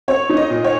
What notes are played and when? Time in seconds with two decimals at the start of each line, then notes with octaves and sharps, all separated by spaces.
0.08 C4 C#5
0.29 D#4
0.37 D#5
0.50 A#2
0.64 C#5